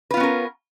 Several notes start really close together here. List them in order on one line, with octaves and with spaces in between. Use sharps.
B4 F4 B3 C#4 A#4